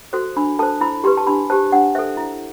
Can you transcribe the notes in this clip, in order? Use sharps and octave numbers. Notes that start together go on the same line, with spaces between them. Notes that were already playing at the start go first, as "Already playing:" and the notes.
F#4 A4 C5
D4 B5
A4 C5 A5
E4 B5
G4 B4 C6
A5
D4 B5
G4 C5 A5
D4 F#5
A4 C5 E5
E4